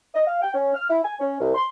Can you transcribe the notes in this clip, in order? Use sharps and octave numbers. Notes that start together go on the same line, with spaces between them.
D#5
F5
G5
C#4
F6
E4
G#5
C#4
C2
C6